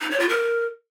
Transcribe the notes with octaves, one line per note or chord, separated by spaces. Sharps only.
D#4
C#5
F4
A#4